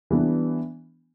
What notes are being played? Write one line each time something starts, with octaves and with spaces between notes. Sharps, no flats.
E3 G3 B3 D4